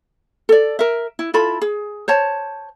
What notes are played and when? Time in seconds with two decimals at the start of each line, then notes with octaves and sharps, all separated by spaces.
0.49 A4 D5
0.79 A#4 E5
1.19 E4
1.34 E4 F4 A4 B5
1.62 G#4
2.08 C5 C#5 A5